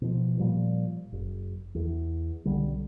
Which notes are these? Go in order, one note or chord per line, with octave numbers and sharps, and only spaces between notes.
B2 F3
A#2 F3 G3
F#1
E2
B1 D3 G3